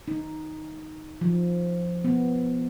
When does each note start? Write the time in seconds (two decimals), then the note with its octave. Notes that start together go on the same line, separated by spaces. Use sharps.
0.08 D#4
1.21 F3
2.04 B3